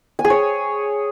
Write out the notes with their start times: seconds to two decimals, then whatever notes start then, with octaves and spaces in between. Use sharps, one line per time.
0.19 G#5
0.25 G#4
0.30 C#5